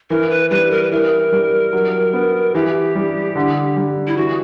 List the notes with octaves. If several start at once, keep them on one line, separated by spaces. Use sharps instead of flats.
E3 A#4
B4
G3 B4
A#4
B4
E3 A#4
G3
F#3
B3
E3 G4
G3
D3
G3
E4
E3 F#4